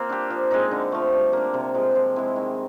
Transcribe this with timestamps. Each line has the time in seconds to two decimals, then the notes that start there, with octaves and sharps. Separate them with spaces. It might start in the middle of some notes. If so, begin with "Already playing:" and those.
Already playing: A#3 C4 F4
0.09 D4 G4
0.30 F3
0.51 G#3 C4 D#4
0.71 D3
0.92 F3 A3
1.13 G3
1.33 A#3 D4
1.54 C3
1.74 F3 G#3
1.95 F3
2.16 G#3 C4 E4
2.36 D#3